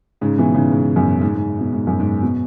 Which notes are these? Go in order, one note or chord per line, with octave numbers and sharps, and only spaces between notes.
G#2 C#3
B2 E3
G#2 C#3
G#2
F#2 B2
G#2
G#2
B2
G#2
F#2
G#2
B2